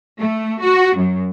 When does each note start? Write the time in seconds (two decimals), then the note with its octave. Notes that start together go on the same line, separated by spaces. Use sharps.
0.19 A3
0.62 F#4
0.96 F#2